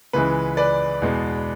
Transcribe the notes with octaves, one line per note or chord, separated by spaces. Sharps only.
C#2 C#3 E3 G#3 B4
B4 D5
E2 B2 G#3 B3